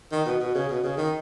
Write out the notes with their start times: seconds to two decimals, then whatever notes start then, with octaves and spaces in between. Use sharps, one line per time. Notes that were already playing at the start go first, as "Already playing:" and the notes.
0.12 D#3
0.26 B2
0.41 B2
0.55 C#3
0.69 B2
0.84 C#3
0.97 D#3